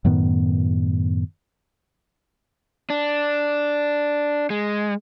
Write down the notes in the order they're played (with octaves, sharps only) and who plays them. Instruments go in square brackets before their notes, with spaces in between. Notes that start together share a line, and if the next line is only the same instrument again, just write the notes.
[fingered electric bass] F#2 A2 D#3 B3
[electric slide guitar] D4
G#3